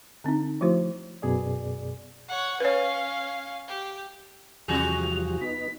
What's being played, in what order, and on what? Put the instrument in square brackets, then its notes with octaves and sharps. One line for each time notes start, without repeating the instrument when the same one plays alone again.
[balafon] D3 C4 D4 D#4
F3 A3 E4 F#4 C5
[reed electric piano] F#2 B2 G#4 D5
[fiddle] C#5 F#5
[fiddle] C#4 F5 [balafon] B4 C#5
[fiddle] G4
[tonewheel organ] E2 F3 G3 [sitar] C3 F#4 G#4 [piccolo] F7
[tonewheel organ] B3 D#4 [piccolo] B6